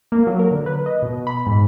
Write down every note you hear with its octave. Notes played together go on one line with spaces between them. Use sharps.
A#3
F#3
A#4
D3
B4
D#5
B2
B5
G#2